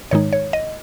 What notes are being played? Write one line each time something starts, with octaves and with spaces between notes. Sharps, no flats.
G#2 D#3 G#3 D#4 C#5
C#5
D#5